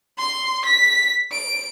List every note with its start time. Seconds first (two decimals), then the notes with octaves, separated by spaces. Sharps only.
0.18 C6
0.66 B6
1.32 D7